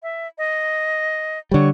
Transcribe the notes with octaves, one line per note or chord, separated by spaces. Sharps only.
E5
D#5
D3 G3 C#5